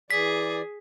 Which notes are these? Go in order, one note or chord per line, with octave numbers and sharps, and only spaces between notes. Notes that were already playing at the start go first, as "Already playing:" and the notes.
E3 G#4 D5 B6